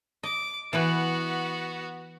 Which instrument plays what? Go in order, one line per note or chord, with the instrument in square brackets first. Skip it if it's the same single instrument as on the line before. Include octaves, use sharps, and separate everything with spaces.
[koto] D#5 [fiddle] D6
[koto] E3 E4 B4 [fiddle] B3 F#4